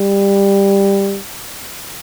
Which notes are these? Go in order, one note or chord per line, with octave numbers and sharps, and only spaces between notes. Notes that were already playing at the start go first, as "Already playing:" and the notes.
Already playing: G3